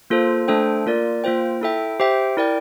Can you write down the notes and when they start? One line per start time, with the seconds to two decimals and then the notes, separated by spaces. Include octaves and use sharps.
0.10 A#3 F4 A4 C5
0.48 A3 D4 A4 C5 G5
0.86 A#3 F4 A#4 D5
1.24 A#3 F4 C5 G5
1.61 E4 A4 E5 G5
2.00 G4 C5 E5 G5
2.37 E4 A#4 D5 G5